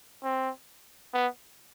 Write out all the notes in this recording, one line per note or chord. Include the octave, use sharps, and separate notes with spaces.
C4
B3